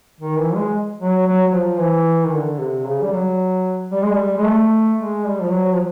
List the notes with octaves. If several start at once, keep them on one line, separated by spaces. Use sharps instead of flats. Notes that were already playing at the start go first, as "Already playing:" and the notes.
D#3
E3
G#3
F#3
F#3
F#3
F3
E3
D#3
D3
C3
C#3
G3
F#3
G3
G#3
G3
G#3
A3
G#3
G3
F3
F#3
F3